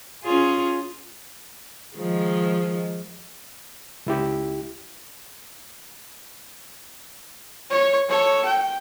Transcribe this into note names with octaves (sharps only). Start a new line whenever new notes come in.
C#4 F4 G#4
D#3 F3 G#3
C#2 E4 G4
C#5
A4 C#5
G5